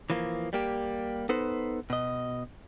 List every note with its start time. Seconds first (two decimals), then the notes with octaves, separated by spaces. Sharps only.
0.10 E3 F3 A#3
0.53 G3 A#3 G4
1.29 B3 D#4 A4 B4 C5
1.90 B2 D#5